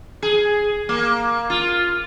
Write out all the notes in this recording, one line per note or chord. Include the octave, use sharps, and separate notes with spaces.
G#4
A#3
F4